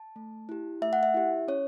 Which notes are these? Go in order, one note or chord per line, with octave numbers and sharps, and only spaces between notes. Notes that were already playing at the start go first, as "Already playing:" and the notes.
Already playing: A5
A3
E4 G4
A3 E5
F#5
E5
E4 G4
C#4 C#5